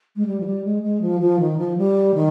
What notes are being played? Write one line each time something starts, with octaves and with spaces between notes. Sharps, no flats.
G#3
G3
F3
G3
G#3
G#3
F3
F3
D#3
F3
G3
D#3